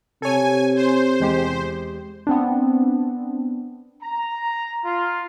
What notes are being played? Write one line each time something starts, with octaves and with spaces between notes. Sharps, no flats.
C3 A4 C#5 G#5
C5
E2 G#3 G4
B3 C4 D4
A#5
F4